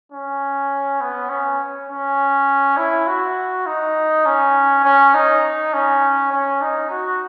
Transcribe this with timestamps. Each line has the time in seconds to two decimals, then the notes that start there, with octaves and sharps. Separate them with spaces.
0.12 C#4
1.01 B3
1.30 C#4
1.90 C#4
2.77 E4
3.08 F#4
3.66 D#4
4.26 C#4
4.84 C#4
5.15 D#4
5.74 C#4
6.32 C#4
6.62 D#4
6.91 F#4